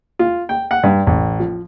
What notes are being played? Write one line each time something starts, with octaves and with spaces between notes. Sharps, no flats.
F4
G5
F#5
G2
A1
F3